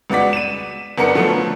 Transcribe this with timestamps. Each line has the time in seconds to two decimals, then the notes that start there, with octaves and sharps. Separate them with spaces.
0.10 C#2 B3 F#4 D5 B6
0.33 D#7 E7
0.98 F#1 B3 D4 A#4 C#7
1.14 D3 F3 F#3 A3 B3